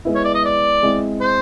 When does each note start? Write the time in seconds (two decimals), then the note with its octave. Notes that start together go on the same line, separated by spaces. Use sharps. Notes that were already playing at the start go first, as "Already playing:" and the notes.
0.05 G#3 B3 E4
0.15 C#5
0.24 D5
0.35 D#5
0.44 D5
0.83 G#3 C4 E4
1.21 C5